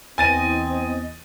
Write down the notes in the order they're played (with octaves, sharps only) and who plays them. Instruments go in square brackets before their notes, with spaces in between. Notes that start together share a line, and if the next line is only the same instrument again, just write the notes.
[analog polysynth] E2 D#5 [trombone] C4 [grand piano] G#5 A6 D#7